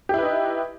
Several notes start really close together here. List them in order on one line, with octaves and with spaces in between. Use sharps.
G4 E4 B4 D#4